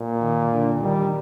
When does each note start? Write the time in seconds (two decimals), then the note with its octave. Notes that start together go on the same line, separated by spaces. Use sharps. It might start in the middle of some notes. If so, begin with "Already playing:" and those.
Already playing: A#2
0.21 D#3
0.51 D3
0.81 D#3 G3